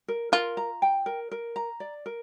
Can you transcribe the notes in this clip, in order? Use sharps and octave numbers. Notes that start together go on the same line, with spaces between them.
A#4
F4 A#4
A#5
G5
A#4
A#4
A#5
D5
A#4